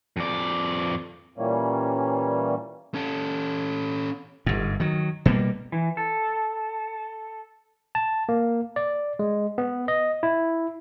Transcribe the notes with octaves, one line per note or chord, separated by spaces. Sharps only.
F2 D5
A#2 E3 G3 A#3 C#4
C#4 A4
G1 G#2
D#3 F#3
B2 G3 A#3
E3
A4
A5
A#3
D5
G#3
B3
D#5
E4